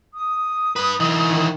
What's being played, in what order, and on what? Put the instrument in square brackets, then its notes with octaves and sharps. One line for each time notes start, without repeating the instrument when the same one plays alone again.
[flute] D#6
[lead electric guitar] G2 B4
E3 D#4
[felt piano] D#3